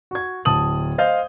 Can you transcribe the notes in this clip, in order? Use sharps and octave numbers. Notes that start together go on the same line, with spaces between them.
F#4 G#6
D1 A5 D#6 F#7
C5 D#5 F5 G6